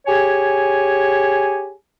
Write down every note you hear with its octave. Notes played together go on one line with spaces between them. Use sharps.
G4 G#4 C#5 G#5